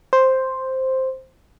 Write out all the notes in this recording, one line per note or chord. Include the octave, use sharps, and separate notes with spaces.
C5